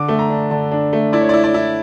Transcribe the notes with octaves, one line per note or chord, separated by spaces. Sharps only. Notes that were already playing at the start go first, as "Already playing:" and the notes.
Already playing: D3 D6
A3
A#5
D4
D3 A5
D4
A3
E4 D5
C#5
E4 D5
D5
E4